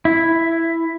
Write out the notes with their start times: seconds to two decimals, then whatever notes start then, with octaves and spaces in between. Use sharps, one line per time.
0.05 E4